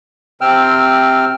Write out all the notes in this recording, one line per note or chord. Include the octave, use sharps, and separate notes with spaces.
C3 C4 G5 E6 F6